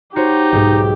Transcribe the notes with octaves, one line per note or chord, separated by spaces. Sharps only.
D#4 F#4 G4 C5 C#5
B1 G#2 G#3